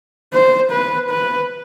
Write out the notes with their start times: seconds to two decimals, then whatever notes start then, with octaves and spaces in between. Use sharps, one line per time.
0.33 C5
0.72 B4
1.10 B4